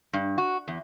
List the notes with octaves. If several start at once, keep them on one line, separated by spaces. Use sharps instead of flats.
G2
F#4
E2